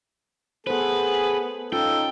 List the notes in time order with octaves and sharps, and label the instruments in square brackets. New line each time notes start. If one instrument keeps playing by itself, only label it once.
[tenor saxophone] B3 [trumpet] G#4 [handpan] A4 C5 [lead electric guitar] B4
[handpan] C#4 F4 [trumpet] D#4 [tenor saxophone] A4 [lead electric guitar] G5